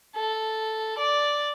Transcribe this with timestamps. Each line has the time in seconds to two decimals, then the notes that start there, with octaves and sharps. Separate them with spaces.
0.16 A4
0.99 D5